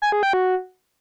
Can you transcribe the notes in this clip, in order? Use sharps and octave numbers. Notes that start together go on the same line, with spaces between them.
G#5
G#4
G5
F#4